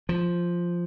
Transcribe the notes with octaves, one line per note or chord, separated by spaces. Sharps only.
F3